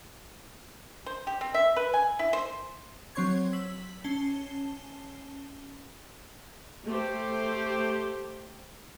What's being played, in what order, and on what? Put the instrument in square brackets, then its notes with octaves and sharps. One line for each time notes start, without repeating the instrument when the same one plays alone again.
[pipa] C5
G4
C4
E5
B4
G#5
E4
C5
[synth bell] F#3 C4 C#5 C6 C#6 G#6
E6 B6 F#7
C#4 A5 C7 G7
[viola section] A3 G4 C5